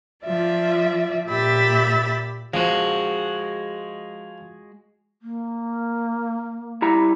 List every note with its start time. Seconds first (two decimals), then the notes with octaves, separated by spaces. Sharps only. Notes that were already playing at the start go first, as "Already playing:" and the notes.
0.25 F3 F4 D5 E5
1.28 A#2 G4 E5 B5 A6
2.54 F3 G#3 F#4
5.22 A#3
6.82 G3 E4 A#5